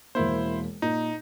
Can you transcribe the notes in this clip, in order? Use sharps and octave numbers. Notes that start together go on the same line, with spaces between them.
E1 A#3 E4 C5
A#2 D#4